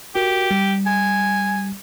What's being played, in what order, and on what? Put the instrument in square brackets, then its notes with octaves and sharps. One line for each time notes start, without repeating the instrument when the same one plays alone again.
[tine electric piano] F#4 A#4 [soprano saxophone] G4
[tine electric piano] G3
[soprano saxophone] G#5